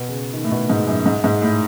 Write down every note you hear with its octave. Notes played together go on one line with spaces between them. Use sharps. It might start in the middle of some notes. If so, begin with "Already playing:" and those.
Already playing: B2
C#3
D#3
A2
B2
G#2
F#2
G#2
G#2
A2